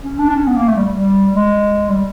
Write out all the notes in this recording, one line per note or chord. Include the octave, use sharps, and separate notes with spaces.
C#4
D4
D4
C#4
B3
A#3
A3
G3
G3
G#3
G3